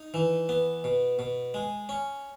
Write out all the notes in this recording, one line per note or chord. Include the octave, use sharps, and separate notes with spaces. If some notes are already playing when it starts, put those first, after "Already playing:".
Already playing: D#4
E3
B3
B2
B2
G#3
C#4